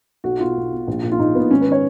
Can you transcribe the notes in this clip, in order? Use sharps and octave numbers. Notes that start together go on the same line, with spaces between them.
B1 F#4
B2 F4
B1
B2
A#1
A#2
F4
A#1 D#4
A#2 B3
G#1 C#4
B4
D#3 C#5